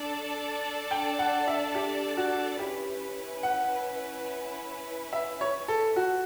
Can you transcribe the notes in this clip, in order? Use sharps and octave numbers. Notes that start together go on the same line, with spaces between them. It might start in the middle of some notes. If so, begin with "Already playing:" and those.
Already playing: D4 A4 D5
G5
F#5
E5
G4
F#4
C#4 E4 G4 B4
F#5
E5
C#5
A4
F#4